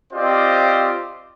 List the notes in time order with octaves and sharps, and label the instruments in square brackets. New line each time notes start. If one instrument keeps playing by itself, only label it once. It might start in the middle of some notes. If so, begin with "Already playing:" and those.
[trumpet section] C4 F4 G4 C5 D5 D#5